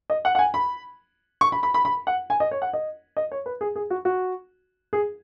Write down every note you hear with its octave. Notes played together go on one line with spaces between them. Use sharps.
D#5
F#5
F#5
G#5
B5
C#6
B5
B5
B5
B5
F#5
G#5
D#5
C#5
F#5
D#5
D#5
C#5
B4
G#4
G#4
F#4
F#4
G#4